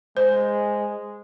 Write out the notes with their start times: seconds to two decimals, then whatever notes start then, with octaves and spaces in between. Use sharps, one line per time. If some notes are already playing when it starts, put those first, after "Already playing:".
0.17 G#3 C5